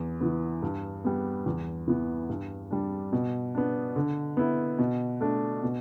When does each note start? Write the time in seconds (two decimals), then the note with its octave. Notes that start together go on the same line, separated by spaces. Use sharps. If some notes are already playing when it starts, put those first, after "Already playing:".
Already playing: E2
0.21 E3 B3
0.62 G2
1.04 G3 B3
1.46 E2
1.88 E3 B3
2.29 G2
2.71 G3 D4
3.12 B2
3.55 B3 D4
3.96 D3
4.37 B3 E4
4.79 B2
5.21 A3 D4
5.63 B2